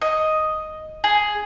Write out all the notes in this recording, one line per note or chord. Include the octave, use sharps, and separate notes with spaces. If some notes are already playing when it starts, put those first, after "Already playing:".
D#5
G#4